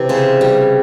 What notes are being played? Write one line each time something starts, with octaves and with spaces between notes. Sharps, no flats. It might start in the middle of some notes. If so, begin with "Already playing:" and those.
Already playing: C3 E3
C#3 C5
G3